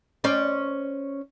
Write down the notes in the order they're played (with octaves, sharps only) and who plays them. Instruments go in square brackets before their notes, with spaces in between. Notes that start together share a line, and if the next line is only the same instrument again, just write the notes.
[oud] C#4 C5 D5